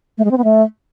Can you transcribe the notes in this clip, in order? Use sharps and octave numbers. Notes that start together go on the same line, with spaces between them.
A3
G#3
C4
B3
A3